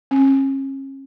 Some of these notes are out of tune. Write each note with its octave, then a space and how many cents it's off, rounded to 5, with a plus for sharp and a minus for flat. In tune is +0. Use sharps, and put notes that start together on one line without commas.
C#4 -40